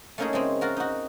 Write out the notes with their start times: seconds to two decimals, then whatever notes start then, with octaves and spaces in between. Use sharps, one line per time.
0.18 A3 A#3 C#4 D#4 E4 G#4
0.33 C#3 G#3 C4 C#4
0.61 F4 F#4 A#4
0.77 D#4 F#4